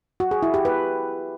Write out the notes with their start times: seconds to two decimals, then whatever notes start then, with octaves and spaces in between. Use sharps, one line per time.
0.20 F#4
0.31 G#4
0.43 E4
0.54 G4
0.65 B4